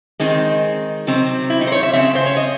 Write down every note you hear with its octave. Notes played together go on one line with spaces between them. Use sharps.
D#3 G#3 C4 D#4
C3 F#3 C4
E4
D#4
C5
C#5
E5
C#3 G#3 C4 E5
C5
C#5
D#5